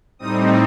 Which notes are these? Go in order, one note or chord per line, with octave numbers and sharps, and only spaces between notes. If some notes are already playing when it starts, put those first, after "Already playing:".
A2 G3 C4 D#4 D#6